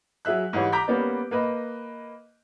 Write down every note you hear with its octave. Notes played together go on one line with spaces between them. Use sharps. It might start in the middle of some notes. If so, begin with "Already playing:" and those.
F#3 G#4 E5 F#6
G#2 E3 G3 C#5
A#5 D6 G6 B6
G3 A#3 B3 C#4 B4 D5
A#3 B4 D#5